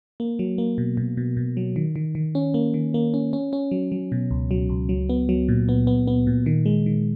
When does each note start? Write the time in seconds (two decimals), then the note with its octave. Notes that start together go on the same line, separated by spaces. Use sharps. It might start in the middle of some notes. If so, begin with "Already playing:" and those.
0.20 A#3
0.39 F#3
0.58 A#3
0.78 B2
0.97 B2
1.17 B2
1.37 B2
1.57 F#3
1.76 D#3
1.96 D#3
2.15 D#3
2.35 C#4
2.54 A#3
2.74 D#3
2.94 A#3
3.14 C#4
3.33 C#4
3.53 C#4
3.71 F#3
3.92 F#3
4.12 B2
4.31 C#2
4.51 F#3
4.69 C#2
4.89 F#3
5.09 B3
5.29 F#3
5.49 A#2
5.69 B3
5.87 B3
6.07 B3
6.27 A#2
6.46 D#3
6.66 G#3
6.86 D#3